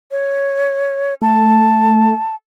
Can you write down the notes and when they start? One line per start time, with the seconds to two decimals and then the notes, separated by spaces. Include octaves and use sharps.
0.11 C#5
1.22 A3 A5